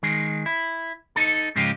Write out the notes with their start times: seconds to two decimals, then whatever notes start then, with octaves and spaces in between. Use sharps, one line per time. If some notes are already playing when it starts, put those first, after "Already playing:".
0.03 D#3 G#3
0.46 E4
1.16 D#4 A4
1.56 G#2 C#3 F3 G#3 F4 G4